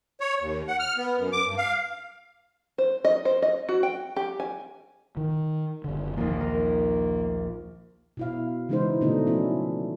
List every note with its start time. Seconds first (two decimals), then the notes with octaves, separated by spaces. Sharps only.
0.21 C#5
0.41 D#2
0.67 F#5
0.79 F6
0.97 B3
1.18 F#2
1.32 D6
1.45 G2
1.57 F5
2.78 C5
3.05 D#5
3.25 C5
3.42 D#5
3.69 F#4
3.83 G5
4.16 G4
4.40 G#5
5.17 D#3
5.84 F#1 D3
6.17 A#1 D#2 A#3
6.40 A#4
8.17 B2 E4 F5
8.69 C#3 E3 G#3 D#4 E4 C5
9.01 B2 D3 A3 D4 D#4
9.26 F3 C#4 D4 E4